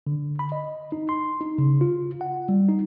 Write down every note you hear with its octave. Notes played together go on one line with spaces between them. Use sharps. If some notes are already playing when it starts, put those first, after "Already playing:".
D3
B5
D#5
D#4
C6
D#4
C#3
F4
F#5
G3
D#4